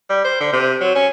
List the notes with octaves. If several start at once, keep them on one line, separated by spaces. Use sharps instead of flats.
G3
C5
D3
C3
F#3
C#4